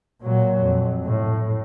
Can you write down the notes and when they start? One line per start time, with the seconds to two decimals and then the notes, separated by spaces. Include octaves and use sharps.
0.22 A#2 F#3
0.62 F2
1.06 A2